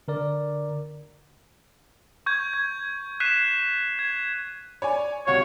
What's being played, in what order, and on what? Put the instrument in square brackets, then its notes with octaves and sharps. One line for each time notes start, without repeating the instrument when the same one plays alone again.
[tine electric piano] D3 A#4 D5
[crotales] C#6 G6 G#6
G#6
F#6 B6 C7 D#7 E7
G#6
[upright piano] C#5 D5 G#5
[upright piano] C2 F#4 F5 [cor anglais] C#5